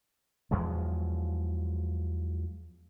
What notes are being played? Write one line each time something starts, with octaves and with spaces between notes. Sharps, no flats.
E2 F3 F#3 G#3